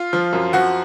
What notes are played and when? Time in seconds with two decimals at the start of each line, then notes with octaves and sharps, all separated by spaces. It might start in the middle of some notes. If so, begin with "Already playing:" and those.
Already playing: F4 F5
0.13 F3
0.33 F#2
0.53 F3 F#4 F#5